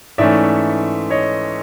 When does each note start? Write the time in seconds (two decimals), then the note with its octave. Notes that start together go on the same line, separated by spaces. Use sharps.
0.18 G#2 E3 A3 C#4 D5 E5
1.10 C#5 D#5